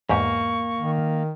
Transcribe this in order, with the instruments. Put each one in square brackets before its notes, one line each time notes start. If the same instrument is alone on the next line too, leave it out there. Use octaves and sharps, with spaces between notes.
[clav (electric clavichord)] E2 G#2 G4 [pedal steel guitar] A#3 [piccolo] C#6
[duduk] D#3